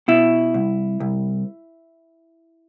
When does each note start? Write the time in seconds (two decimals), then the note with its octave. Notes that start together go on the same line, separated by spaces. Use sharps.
0.08 B2 E4
0.54 C2
1.00 C2